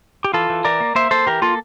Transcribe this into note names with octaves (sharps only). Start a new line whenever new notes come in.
G4
E3 F4 A4
E3
E3 A#4 D5
A#3
A#3 C5 E5
A#3 A4 C5
E3 G4 A#4
A#3 F4 A4